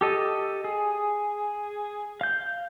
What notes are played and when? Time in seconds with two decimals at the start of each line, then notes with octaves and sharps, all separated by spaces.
0.01 G4 A4 D#5
0.64 G#4
2.21 F5 G6